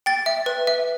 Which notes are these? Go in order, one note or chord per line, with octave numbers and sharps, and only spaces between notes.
G5 A6
E5
B4
E5